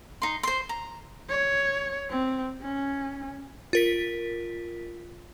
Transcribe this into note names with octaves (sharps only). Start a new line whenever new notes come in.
D#4 C6
C5 C6
A#5
C#5
C4
C#4
F4 A#4 B6